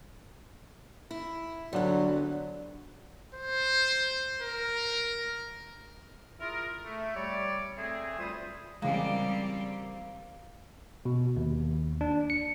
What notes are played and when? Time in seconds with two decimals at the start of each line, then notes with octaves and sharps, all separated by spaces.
1.11 E4
1.73 D3 F#3 G3 B3 C4
3.34 C5
4.41 A#4
6.40 E4 F4 G#4 A#4
6.84 A3
7.15 G3 C#5 D5
7.77 A3 C4 G#4
8.18 D2 G3 F4 B4 C5 D#6
8.82 C#3 E3 G3 G#3 A#3 C4
11.05 B2
11.36 D#2
12.01 D4
12.30 C#7